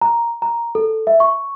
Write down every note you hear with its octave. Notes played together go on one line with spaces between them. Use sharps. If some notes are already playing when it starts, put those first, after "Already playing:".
A#5
A#5
A4
E5
C#6